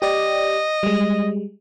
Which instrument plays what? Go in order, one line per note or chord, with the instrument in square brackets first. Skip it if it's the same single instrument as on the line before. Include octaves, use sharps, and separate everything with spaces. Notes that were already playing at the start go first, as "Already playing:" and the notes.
[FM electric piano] G4 D5 [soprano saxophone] D#5
[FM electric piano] G3 G#3